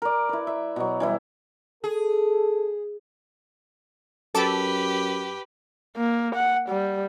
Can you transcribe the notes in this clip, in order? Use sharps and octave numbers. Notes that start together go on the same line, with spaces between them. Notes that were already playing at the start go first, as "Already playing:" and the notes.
A#4 D5
E4 B4
E5
B2 F#3
E3 G3 E4
G#4 A4
F#2 G4 A4 B4 A5 D6
A#3
F#5
G3